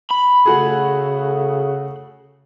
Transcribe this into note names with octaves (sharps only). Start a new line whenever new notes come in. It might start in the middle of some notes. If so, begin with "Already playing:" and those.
B5
C#3 A3 F#4 G#4